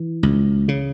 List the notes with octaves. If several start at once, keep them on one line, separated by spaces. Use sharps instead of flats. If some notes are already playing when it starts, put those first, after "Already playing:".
Already playing: E3
C#2
C#3